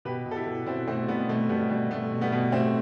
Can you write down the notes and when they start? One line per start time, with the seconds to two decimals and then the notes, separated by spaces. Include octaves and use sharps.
0.05 B2 G4 B4
0.26 B2
0.31 A4
0.36 E4 G4
0.47 B2
0.66 B2 C4 E4
0.87 B2 A3 C4
1.08 B2 G3 B3
1.29 B2 A3
1.49 B2 G3 B3
1.70 B2 G3
1.91 B2 A3
2.12 B2
2.21 G3 B3
2.32 B2
2.52 A2 A3 C4